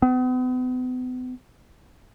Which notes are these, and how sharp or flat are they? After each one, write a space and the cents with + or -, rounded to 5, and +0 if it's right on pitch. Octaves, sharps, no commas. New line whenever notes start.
B3 +40